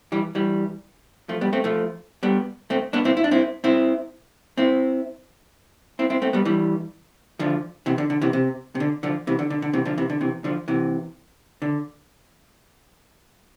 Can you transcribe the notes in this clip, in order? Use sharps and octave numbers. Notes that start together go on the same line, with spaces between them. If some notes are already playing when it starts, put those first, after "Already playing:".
E3 G3
E3 G3
F3 A3
G3 B3
A3 C4
F3 A3
G3 B3
A3 C4
B3 D4
C4 E4
E4
D4
C4 E4
C4 E4
C4 E4
C4 E4
C4 E4
A3 C4
G3 B3
E3 G3
D3 F3
C3 E3
D3
D3
C3 E3
C3
C3
D3
D3 F3
C3 E3
D3
D3
D3
C3 E3
D3 F3
C3 E3
D3
C3 E3
D3 F3
C3 E3
D3